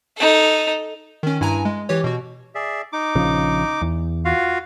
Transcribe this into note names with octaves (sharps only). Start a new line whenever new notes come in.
D#4 A4
D#3 C#4
G2 E4 G#5 A#5
G#3
E3 G4 C#5
B2 F#4
G#4 D5 E5
D#4 D6
A#1 C#3 F3
E2
F4 F#4 F5